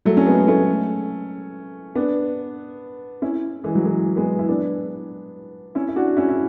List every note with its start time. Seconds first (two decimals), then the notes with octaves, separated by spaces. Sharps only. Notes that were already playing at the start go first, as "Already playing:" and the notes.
0.05 F#3 A3
0.17 C#4
0.27 G#3 B3
0.48 A3 C#4
1.95 B3 D4
3.22 C#4 E4
3.64 E3 G#3
3.75 F#3
3.85 E3 G#3
4.16 G#3 B3
4.39 E4
4.48 B3 D4
5.75 C#4 E4
5.88 E4
5.96 D4 F#4
6.17 C#4 E4
6.29 E4